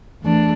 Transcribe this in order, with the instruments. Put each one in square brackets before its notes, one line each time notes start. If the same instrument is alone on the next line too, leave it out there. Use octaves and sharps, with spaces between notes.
[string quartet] E2 E3 A3 D4